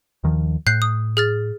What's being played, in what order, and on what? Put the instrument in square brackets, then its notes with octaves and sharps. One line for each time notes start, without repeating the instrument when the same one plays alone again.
[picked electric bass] D#2 D#3 F3
[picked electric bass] A2 [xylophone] F#6 G6 C7
[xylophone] D#6
G#4 F6 A6